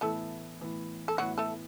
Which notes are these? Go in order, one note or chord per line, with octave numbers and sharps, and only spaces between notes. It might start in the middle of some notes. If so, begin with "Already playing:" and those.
A2 E3 A3 B3 E4 A4
A2 E3 B3 E4
A4
A2 E3 F#3 B3 E4 F#4
A3 A4